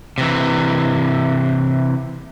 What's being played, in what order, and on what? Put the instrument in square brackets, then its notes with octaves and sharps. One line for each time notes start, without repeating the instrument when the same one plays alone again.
[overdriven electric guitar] C3 E3